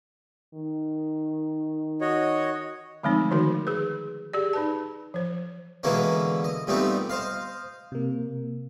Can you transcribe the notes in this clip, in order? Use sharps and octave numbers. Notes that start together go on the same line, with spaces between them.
D#3
F#4 C#5 D#5
D3 F3 G#3 A3 C4 D#4
D#3 F3 D#4 F#4 A#4
G#4 B4
G4 G#4 D5
D#4 B4 A5
F3 C5
B2 D3 E3 G#3 A#3 C#4
D#5
A#2 G3 A3 B3 C4 D#4
C5 D#5 F5
C3 A#3